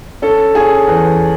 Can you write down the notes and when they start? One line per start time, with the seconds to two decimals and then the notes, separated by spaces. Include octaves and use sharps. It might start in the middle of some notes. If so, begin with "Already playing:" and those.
0.22 C#4 A4
0.55 C#4 G#4
0.87 E2